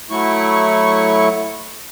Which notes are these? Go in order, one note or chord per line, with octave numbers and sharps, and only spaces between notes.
F#3 A3 E4 C#6